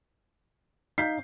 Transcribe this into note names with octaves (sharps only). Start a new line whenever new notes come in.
D#4 F5 G6 B6 C7